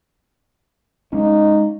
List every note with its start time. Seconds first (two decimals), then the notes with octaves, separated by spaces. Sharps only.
1.13 G#3 C#4 D#4